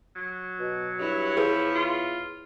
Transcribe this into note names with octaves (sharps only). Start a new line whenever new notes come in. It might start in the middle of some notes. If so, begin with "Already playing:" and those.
F#3
B2
G2 E4 C#5
E2 F3 G#4 B4
F4